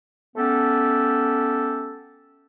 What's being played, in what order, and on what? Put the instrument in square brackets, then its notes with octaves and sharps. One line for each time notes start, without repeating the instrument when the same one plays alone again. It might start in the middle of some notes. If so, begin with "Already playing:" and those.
[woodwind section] A3 B3 C#4 G4 A4